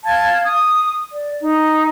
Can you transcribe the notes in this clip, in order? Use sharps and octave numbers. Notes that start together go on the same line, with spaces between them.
F5 A5 G#6
D#6
D5
D#4